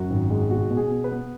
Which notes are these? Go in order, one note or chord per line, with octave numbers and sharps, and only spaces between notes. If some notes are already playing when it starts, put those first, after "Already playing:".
Already playing: F#2 F#4
G#1
G#3
B2 F#4
B2
G#4
B3
B4
B3